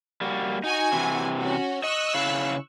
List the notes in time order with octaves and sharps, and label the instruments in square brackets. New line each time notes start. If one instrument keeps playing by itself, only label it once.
[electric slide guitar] G3 A#3 F#4
[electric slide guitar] D#4 [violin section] F#4 G#5
[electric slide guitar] C3 E3
[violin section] C#4 F#4
[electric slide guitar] D#5 [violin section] C#6 E6 F#6
[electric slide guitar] C#3 E4 F5